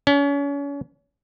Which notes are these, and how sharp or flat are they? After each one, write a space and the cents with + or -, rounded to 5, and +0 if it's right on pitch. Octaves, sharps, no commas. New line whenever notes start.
C#4 +35